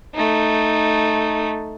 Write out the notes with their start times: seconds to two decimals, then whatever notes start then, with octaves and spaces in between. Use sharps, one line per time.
0.14 A3 D#4